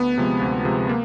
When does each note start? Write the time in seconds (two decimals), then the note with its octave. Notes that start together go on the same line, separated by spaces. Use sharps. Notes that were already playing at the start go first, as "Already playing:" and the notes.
Already playing: D2 B3
0.17 C3 F3 G#3
0.41 D2
0.65 C3 F3 G#3
0.89 A#3